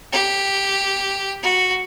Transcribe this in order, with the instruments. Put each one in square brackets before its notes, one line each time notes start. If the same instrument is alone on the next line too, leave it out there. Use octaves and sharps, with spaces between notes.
[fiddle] G4
F#4